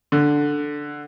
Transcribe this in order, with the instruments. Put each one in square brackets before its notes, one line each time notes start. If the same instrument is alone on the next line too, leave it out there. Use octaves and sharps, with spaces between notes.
[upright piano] D3